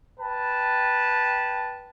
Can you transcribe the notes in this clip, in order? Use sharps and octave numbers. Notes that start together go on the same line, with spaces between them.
B4 G5 A5